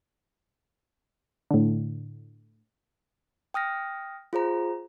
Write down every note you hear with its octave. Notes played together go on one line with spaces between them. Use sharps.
A2 D3
G5 D#6 F6 A#6
F4 G#4 C5 A#5